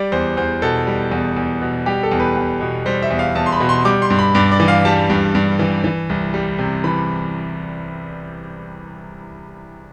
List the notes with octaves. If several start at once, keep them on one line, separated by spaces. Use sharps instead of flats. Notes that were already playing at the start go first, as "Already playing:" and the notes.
Already playing: G3 D5
E2 C5
E2 C5
B2 A4
G3
E2
E2
B2
G3 G4
A4
E2
B4
E2
B2
G3 C5
E5
E2
F5
E2 A5
C6
B5
B2
C6
G3 D6
C6
G2
B5
G2 D5
D5
E3
F5
G3 A5
G2
G2
E3
E3
C2
G3
C3
E3 B5